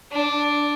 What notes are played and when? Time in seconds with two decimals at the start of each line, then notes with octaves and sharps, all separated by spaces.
0.11 D4